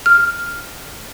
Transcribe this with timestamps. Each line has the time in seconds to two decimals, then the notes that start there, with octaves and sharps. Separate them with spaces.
0.06 F6